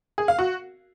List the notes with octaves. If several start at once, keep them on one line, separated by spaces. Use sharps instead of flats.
G#4
F5
F#4